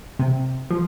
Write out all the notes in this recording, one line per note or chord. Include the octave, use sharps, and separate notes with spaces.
C3
F3